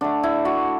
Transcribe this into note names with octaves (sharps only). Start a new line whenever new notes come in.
D3 A3 D4
E4
F#4